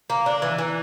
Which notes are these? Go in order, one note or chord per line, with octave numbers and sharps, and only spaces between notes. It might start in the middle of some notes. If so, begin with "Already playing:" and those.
A#3
D4
E3
E3